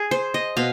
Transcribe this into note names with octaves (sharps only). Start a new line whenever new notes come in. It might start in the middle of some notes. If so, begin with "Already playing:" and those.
Already playing: G#4
C5
D#5
B2 F5